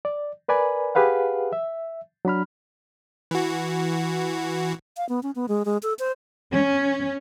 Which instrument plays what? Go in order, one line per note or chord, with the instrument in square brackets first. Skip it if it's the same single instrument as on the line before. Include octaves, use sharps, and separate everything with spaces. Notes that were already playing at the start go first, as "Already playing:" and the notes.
[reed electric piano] D5
A#4 B4 D5 G#5 B5
G4 G#4 B4 F5 F#5
E5
F#3 D4 B5 F6
[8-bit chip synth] E3 F#4
[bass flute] F5
B3
C#4
B3
G#3
G#3
A4
C5
[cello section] C#4